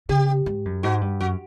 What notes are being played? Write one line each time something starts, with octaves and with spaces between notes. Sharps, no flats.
C#3 G4
G#2
F#2
G#2 F#4
G2
F#2 F#4